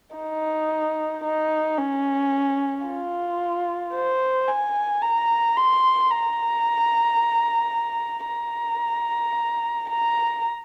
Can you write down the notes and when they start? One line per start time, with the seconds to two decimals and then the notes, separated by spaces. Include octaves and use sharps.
0.16 D#4
1.24 D#4
1.78 C#4
2.86 F4
3.95 C5
4.48 G#5
5.02 A#5
5.57 C6
6.11 A#5
8.27 A#5
9.89 A#5